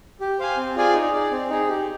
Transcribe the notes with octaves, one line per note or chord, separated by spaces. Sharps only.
G4
C5 F5 G#5
C4
F4 G#4 D5 G#5
D#4
G#4 D5
C4
D#4 G#4
G4